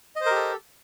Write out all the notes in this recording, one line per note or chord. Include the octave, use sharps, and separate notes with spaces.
G4 A4 A#4 C5 D#5